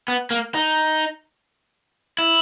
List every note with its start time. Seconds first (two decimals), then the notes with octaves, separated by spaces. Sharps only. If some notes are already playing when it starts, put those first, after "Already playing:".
0.08 B3
0.31 A#3
0.54 D#4
2.18 E4